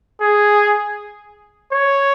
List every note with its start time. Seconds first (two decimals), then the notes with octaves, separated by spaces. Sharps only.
0.21 G#4
1.72 C#5